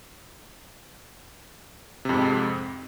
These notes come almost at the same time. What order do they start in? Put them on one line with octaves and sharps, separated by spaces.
C3 F2 G#2